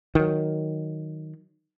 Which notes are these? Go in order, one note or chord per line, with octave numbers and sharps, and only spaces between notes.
D#3 F#3